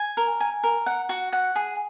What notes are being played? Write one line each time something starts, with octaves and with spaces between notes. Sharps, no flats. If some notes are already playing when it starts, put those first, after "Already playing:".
Already playing: G#5
A#4
G#5
A#4
F#5
F#4
F#5
G#4